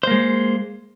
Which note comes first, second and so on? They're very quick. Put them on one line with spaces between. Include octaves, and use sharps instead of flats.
C5 A#3 G#3